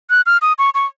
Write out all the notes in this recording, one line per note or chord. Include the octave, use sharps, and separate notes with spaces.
F#6
F6
D#6
C#6
C#6